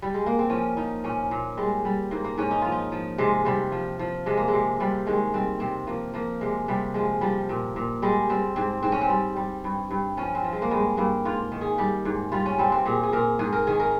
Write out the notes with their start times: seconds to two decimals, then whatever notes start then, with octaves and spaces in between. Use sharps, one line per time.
0.02 G3
0.14 G#3
0.26 A#3
0.39 C4
0.50 F3 C#4
0.77 F3 D#4
1.04 A#2 C#4
1.31 A#2
1.57 G3 G#3
1.85 G3
2.11 G#2 A#3
2.24 A#3
2.37 G#2 C#4
2.51 D#4
2.62 F3 F4
2.72 D#4
2.92 F3
3.18 C3 G#3
3.45 C3 G3
3.72 F3
3.99 F3
4.26 C3 G#3
4.37 A#3
4.48 C3 G#3
4.80 C3 G3
5.07 D#3 G#3
5.34 G3 C4
5.60 C3 C4
5.87 F3 A#3
6.14 F3 A#3
6.41 C3 G#3
6.68 C3 G3
6.94 F3 G#3
7.21 F3 G3
7.49 A#2
7.76 A#2
8.02 G3 G#3
8.29 G3 C4
8.56 G#2 C4
8.82 G#2 C4
8.92 C#4
9.01 C4
9.09 G3
9.36 G3
9.64 G2
9.91 G2
10.17 F3 C#4
10.35 C4
10.44 F3
10.52 G#3
10.62 A#3
10.70 G2 G#3
10.97 G2 A#3
11.25 G#2 F4
11.52 D#3
11.61 G#4
11.78 G3 G4
12.05 G#2
12.32 G3 F4
12.46 C#4
12.58 G3 C4
12.72 C4
12.85 A#2 G#4
13.03 G#4
13.12 A#2 A#4
13.39 G#2 G#4
13.53 A#4
13.67 D#3 G#4
13.80 A#4